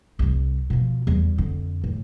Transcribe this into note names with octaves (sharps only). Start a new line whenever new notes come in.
C2 G3
B2 F3
E2 G3
F2 D3
A2